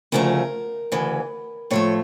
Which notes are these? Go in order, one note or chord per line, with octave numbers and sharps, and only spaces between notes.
D2 C#3 F3 A3 A#4
D2 C#3 E3
A2 F3 A3 C#5